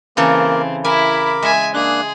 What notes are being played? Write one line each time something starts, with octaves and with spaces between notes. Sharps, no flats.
C#3 E3 A#3 C4 A4 A#4
E4 A#4 G#5 B5 D6
G#3 E5 G#5
A#3 D4 G#4 F#6